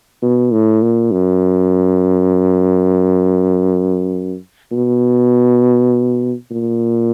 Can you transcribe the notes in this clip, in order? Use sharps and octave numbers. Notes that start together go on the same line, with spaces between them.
B2
A2
A#2
F#2
B2
A#2